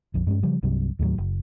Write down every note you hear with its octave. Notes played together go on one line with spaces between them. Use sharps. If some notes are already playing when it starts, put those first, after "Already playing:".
A#1 F2
G2 G#3 C#4
C#3 F3 G3
C2 G2 C3 F#3
D#2 A2 F3 F#3
F#1